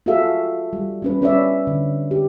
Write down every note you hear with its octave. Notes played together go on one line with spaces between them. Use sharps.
F4 F#4 G#4 A4 E5 F5
G3
G3 C#4 B4
G3 C#4 B4 C#5 D5 E5
D3
G4